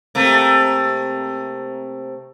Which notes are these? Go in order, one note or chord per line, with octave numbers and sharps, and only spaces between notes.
C3 A3 A#3